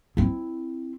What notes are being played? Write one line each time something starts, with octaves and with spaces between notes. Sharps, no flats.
C4 E4